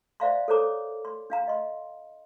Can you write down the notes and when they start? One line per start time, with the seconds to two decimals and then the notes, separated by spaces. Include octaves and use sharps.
0.20 C5 D5 E5 F5 A#5 C6
0.48 A4 A#4 C5 C#5 A#5 D6
1.05 C6
1.30 D4 F5 A#5
1.48 D#5 C6